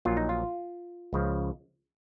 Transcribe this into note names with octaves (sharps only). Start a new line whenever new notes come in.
A#1 A#2 F#3 F4
D#4
F4
C#2 C#3 F3